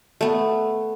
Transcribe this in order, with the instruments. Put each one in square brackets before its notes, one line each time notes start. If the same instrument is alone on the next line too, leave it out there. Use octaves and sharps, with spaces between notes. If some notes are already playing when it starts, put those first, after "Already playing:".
[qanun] A3 B3